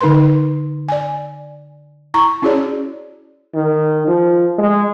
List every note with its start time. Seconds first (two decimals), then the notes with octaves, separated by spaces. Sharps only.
0.01 D3 D#4 A#4 B4 C6
0.89 D5 G#5
2.14 E4 A#5 C#6
2.42 C#4 E4 F#4 G#4 C#5 D5
3.54 D#3
4.07 F3
4.58 G#3